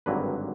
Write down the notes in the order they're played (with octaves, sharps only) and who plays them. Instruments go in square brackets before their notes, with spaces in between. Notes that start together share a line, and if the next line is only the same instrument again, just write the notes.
[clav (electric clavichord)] G#1 G2 D3 F#3 A#3 B4